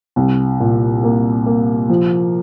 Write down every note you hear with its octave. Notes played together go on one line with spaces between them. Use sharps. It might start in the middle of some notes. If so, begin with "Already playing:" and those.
C2
A#2
A#3
A#3
F3